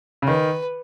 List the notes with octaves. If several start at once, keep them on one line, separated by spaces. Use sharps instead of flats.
C#3
D#3 B4